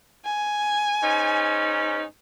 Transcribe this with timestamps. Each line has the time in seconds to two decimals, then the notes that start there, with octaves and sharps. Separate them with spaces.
0.25 G#5
1.01 G#2 C#4 D#4